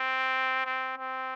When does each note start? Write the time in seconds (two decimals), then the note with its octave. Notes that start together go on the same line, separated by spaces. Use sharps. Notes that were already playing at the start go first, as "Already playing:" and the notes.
Already playing: C4
0.65 C4
0.98 C4